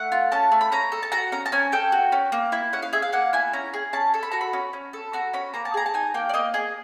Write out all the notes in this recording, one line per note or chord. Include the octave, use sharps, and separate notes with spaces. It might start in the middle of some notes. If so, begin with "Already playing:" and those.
Already playing: A3 F#5
F4
C#4 A5
A3
B5
C#4 A#5
A4
A5
F#4 A#5
C#4 A#5
A5
C#4 G#5
A4 G5
F#4
C#4
A#3
E4
C#4 F#5
F5
G#4 E5
F5
A#3 F#5
E4 G#5
C#4 A#5
G#4
C#4 A5
A4
B5
F#4 A#5
B5
C#4
C#4
A4
F#4 A#5
C#4 B5
A#3 A#5
A5
G#4 A#5
A5
D#4 G#5
A#3 G5
D5
A#3 D#5
G#4 D#5